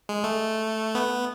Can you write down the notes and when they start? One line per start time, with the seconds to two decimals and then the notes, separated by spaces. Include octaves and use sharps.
0.09 G#3
0.24 A3
0.95 B3